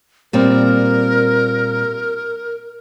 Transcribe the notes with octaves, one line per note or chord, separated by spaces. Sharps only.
A#2 G3 C4 A#4